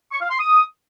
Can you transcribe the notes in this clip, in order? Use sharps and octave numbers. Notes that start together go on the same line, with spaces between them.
C#6
F5
C6
D#6